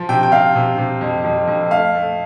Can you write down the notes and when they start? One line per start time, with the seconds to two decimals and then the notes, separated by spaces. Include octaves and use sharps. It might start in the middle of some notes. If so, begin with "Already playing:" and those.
Already playing: F3
0.09 C3 G5
0.23 G5
0.32 C3 F5
0.55 C3
0.78 C3
1.01 F2
1.24 F2
1.48 F2
1.71 A3 F5
1.95 A3